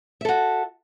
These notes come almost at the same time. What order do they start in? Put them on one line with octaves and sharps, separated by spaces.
E5 A4 F#4